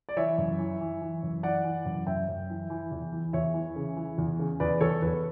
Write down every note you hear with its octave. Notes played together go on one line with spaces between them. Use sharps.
D5
E3 C#5 E5
F#2
E3
E3
E3
F#2
E3 D5 F#5
E3
F#2
F#2 E5 G5
F#2
E3
E3
E2
E3
E2 C#5 E5
E3
C#3
E3
E2
C#3
E2 B4 D5
E2 A4 C#5
E2 B4